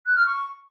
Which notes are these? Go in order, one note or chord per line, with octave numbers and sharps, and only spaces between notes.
F#6
F6
C#6